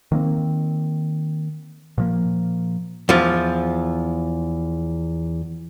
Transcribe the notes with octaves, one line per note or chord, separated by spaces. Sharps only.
D#3 A#3 C4
A#2 F3 A#3
E2 F3